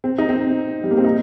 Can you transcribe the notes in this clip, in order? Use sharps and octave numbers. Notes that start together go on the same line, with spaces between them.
C4
D#4
C4
G3
A#3
C4
D#4